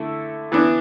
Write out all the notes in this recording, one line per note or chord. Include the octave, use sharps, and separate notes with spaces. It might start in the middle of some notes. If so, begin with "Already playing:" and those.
Already playing: D3 A3 E4 A4
E3 B3 D4